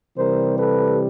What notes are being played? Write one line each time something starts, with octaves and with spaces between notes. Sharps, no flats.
C3 E3 G3 A#4 C5
A4 B4